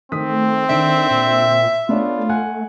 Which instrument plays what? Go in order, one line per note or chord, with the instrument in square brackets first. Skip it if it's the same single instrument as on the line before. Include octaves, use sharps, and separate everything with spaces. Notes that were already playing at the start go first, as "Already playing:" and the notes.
[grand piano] D#3 D#6 B6 [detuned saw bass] A3 [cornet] C4
[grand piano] D3 D4 D7 [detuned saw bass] D#3 [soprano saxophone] E5
[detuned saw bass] A#2
[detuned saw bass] A3 [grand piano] B3 D4 C#5 [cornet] F4
[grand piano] F#5 G#5 F#6